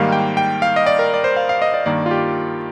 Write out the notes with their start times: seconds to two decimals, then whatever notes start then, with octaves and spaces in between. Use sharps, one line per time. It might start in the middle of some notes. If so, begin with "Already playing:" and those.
Already playing: G#2 D#3 G3 A#3 F5
0.12 G5
0.37 G5
0.62 F5
0.76 D#5
0.86 D5
0.99 A#4
1.14 D5
1.24 C5
1.37 F5
1.49 F5
1.62 D#5
1.74 D5
1.86 G2 D#3 A#3 D5
2.06 F4
2.11 G4